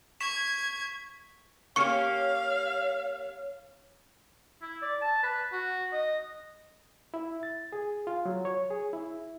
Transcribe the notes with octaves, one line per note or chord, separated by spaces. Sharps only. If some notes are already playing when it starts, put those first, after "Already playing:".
C#6 G#6 B6 E7
A#3 C#4 G4 C#5 F5 C#6 C#7
E4
D5
A5
B4
F#4
D#5
E4
A6
G#4
F4
F#3
C#5
G#4
E4